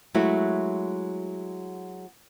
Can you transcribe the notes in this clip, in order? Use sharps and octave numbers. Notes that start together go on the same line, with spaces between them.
F#3 G#3 A3 E4 F#4 C#5